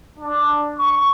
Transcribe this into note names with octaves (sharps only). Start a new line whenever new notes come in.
D4
C#6